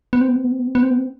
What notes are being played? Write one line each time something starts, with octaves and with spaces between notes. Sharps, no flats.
B3
C4
B3
C4
B3
C4
B3
C4
B3
C4
B3
C4